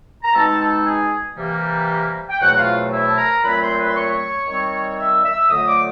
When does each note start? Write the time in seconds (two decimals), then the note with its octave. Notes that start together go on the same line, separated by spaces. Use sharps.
0.23 A#5
0.33 B2 G#3 C4 D#4 A4 A5
0.59 A4 A5
0.85 G#4 G#5
1.36 C3 E3 G3 A#3
2.29 G5
2.40 E2 B2 F#3 A3 C4 F#4 F#5
2.57 F4 F5
2.91 E4 E5
3.06 A5
3.17 A#4 A#5
3.43 A#2 F#3 A3 C4 B4 B5
3.60 C5 C6
3.77 B4 B5
3.87 C6
3.95 C#5 C#6
4.46 D#3 G3 C4
4.98 E5 E6
5.24 E5 E6
5.49 F2 D3 F#3 A3 D#5 D#6
5.67 D5 D6